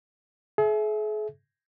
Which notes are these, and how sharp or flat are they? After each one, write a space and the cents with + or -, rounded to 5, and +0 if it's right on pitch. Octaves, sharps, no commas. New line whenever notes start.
G#4 +40 E5 +0